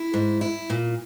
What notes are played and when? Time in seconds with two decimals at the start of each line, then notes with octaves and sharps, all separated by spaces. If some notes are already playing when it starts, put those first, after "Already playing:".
Already playing: E4
0.14 G#2
0.41 E4
0.70 A#2